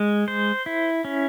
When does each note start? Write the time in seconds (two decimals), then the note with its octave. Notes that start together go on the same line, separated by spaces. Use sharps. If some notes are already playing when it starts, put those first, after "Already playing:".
Already playing: G#3
0.28 C5
0.66 E4
1.05 C#4